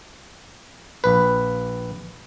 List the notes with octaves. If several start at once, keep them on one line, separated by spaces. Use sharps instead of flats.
A#1 B4